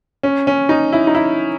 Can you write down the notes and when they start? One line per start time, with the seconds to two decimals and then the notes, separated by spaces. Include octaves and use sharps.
0.23 C#4
0.47 C#4
0.69 D#4
0.93 E4
1.07 D#4
1.15 E4